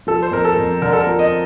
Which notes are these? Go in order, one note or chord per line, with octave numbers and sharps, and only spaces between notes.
F3 A4
C5
F2 A#4
A4
F2
D3 A#4
A4
A#4
F3
D#5